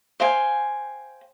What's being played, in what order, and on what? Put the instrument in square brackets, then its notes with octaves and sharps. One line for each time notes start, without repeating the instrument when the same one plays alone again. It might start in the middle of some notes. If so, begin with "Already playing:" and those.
[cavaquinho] C5 F5 G5 G#5